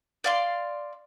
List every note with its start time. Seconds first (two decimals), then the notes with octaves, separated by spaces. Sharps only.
0.24 D5 F5 C6